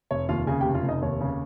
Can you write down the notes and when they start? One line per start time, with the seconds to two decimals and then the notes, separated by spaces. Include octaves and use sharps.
0.11 F1 C#5
0.29 D#2 F4 F5
0.47 C#3 G#4 G#5
0.61 F1 G4 G5
0.75 F4 F5
0.83 F1
0.89 D#4 D#5
1.02 D#2 C#5
1.21 C#3